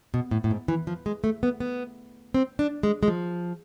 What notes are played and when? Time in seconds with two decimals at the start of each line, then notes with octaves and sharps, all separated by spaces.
0.14 B2
0.31 A2
0.44 A2
0.51 G#2
0.68 E3
0.87 F3
1.06 G#3
1.24 A3
1.43 B3
1.60 B3
2.34 C4
2.59 D4
2.83 G#3
3.03 G#3
3.08 F3